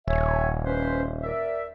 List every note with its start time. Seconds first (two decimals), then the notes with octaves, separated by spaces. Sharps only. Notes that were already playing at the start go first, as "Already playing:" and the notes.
0.08 D#1 C#5 E5 G#5
0.65 C#4 B4 C5
1.23 A#4 D5 E5